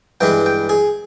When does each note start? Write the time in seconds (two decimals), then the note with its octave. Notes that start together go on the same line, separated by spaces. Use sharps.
0.21 G2 E3 G#3 G5
0.46 G5
0.69 G#4